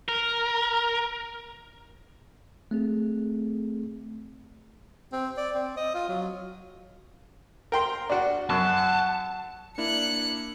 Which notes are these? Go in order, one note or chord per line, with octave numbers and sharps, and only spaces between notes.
A#4
A3 C4 G#4
C4
D5
C4
D#5
F4
F#3
A#4 G5 C6
D4 F#4
F#2 F#5 A5
A#3 D4 E4 F#6 C#7